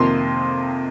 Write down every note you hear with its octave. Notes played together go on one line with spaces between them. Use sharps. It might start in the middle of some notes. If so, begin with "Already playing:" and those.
Already playing: F2 C3 D#3 A#3 F4 C6